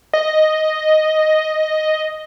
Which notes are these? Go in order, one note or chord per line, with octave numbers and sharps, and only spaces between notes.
D#5